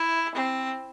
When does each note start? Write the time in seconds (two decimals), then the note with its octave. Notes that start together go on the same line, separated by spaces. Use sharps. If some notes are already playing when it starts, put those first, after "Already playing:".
Already playing: E4
0.35 C4